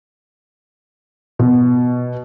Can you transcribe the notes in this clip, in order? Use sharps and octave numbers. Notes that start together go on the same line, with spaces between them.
B2